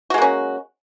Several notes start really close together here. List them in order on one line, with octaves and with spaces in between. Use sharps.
F#4 G#3 A#3 C#4